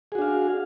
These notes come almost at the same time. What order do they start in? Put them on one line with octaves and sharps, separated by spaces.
G#4 F#4 D4 F5